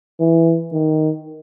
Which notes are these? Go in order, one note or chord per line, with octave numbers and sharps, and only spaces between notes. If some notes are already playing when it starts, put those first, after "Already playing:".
E3
D#3